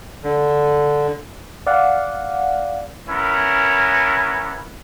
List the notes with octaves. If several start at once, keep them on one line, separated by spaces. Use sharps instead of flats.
D3
D5 F5 F#5
B3 C#4 E4 A#4